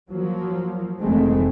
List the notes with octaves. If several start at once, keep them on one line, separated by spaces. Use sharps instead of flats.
F3 F#3 A#3
F1 D#3 E3 G#3 A3 C4